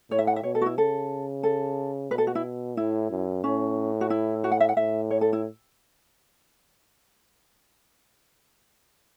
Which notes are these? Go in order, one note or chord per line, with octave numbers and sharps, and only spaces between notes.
A2 C#5
E5
F#5
E5
B2 C#5
A4
F#4
E4
C#3 A4
A4
B2 B4
A4
F#4
E4
A2 E4
F#2
A2 C#4
F#4
E4
F#4
F#5
E5
F#5
A2 E5
C#5
A4
E4